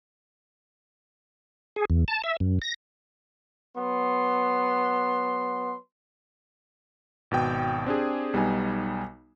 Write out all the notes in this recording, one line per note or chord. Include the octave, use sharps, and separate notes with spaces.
G#4
E2
A5
E5
F#2
A#6
F#3 B3 C6
G#1 B2 G5
C4 D4 G4 G#4
B1 G3 B3 D#4 G#5